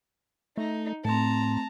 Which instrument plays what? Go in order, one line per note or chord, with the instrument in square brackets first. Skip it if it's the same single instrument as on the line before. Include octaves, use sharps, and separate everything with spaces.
[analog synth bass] A3 [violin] D#4
[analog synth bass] A2 [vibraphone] A3 C4 [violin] A5 A#5